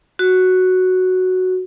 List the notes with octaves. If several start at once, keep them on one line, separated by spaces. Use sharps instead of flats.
F#4